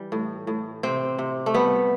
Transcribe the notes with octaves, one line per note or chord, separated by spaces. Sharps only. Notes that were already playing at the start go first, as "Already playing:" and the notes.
Already playing: E3 G3
A2
A2
C3 C4
C3
A3
G3 B3